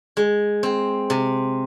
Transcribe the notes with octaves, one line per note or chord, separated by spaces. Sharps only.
G#3
C4
C3